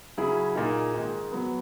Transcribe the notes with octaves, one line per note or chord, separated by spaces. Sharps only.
C#3 F#3 C#4 E4 G#4
A#2 A#3 D#4 G#4
G#2 D#3 G#3
F#3 B3